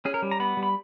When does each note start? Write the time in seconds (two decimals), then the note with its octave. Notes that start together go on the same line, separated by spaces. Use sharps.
0.05 C#4 G#4
0.14 A#4
0.22 G3
0.31 A#5
0.40 B3 B5
0.57 G3
0.63 B5